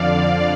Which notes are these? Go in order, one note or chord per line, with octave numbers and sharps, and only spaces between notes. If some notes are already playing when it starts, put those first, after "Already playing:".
Already playing: F2 D3 D5 F5